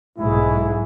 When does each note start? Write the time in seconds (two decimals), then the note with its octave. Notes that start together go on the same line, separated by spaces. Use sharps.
0.18 B1 G#2 G#3 E4